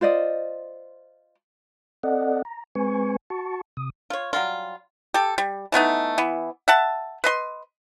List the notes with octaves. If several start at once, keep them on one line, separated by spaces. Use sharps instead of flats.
F4 C5 D5 D#5
C4 A4 D5 D#5 F#5
A#5
G#3 C4 B4 G#5 C#6
F#4 A5 C#6
C3 D#6
F4 C#5
F#3 G3 F4
G4 A4
G3
E3 A3 B3 D#4
E3 B3
E5 F#5 A5
B4 D#5 C6